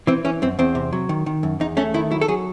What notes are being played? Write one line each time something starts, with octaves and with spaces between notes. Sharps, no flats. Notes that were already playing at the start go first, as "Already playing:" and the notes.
E3 C4
E3 C#4
F#2 C4
E2 C4
C3
F#3
D#3
D#3
F#2
E2 D#4
A3 C#4
D#3 E4
F#3 E4
A4
F#3 G#4